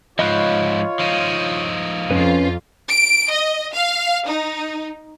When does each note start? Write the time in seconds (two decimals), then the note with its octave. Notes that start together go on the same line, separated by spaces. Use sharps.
0.19 G#2 F3 F4 C#5 D#5 B5 F#6
0.99 F3 D#4
2.11 F2 C#4 F4 B4
2.89 D7
3.31 D#5
3.73 F5
4.27 D#4